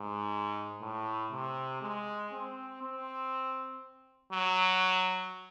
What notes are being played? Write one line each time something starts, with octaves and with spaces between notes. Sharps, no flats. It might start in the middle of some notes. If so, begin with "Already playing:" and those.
Already playing: G#2
A2
C3
G#3
C4
C4
F#3